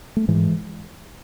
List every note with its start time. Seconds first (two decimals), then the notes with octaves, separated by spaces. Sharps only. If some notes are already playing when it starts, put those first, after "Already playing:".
0.17 A3
0.28 G#2 E3 G#3